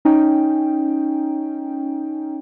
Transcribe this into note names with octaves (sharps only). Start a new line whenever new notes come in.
C#4 D#4 G5